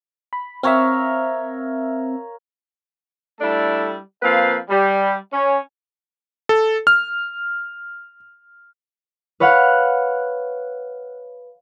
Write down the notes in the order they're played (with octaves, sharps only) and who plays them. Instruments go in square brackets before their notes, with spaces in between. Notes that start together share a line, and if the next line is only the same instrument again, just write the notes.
[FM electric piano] B5
[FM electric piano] C4 E5 [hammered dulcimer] A#4 C#5 F5
[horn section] G3 A3 D4 E4 A4
F3 A#3 C4 B4 F5
G3
C#4
[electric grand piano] A4
F6
[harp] B4 C#5 F5 F#5